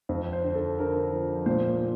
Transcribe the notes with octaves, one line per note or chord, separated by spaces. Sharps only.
F2
C5
D3
A4
D3 A#4
F3
A#2 C5